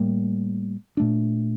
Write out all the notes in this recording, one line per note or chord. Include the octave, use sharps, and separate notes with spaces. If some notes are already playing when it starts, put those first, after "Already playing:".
Already playing: A2 G3 A#3
A#2 A3 D4